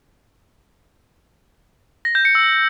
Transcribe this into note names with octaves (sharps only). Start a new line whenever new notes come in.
A#6
G6
C#7
E6